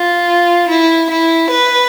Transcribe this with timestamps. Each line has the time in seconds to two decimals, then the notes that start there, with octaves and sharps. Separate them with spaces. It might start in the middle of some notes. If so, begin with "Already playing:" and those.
Already playing: F4
0.68 E4
1.09 E4
1.50 B4